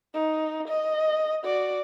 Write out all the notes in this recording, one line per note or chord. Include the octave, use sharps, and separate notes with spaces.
D#4
D#5
F#4 D5